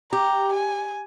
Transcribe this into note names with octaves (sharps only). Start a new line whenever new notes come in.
G4 A#5
G#5